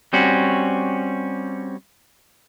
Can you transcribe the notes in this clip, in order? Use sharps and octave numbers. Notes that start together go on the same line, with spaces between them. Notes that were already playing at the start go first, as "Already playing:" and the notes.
G3 C4 C#4 F#4